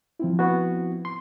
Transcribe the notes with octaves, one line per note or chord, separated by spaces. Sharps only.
F3 C4 E4
B3 F#4
C6